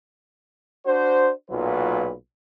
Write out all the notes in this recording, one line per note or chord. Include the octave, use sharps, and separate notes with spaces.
D4 F#4 C5
B1 A#2 F#3 F4 B4